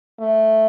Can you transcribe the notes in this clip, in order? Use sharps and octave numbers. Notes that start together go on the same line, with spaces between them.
A3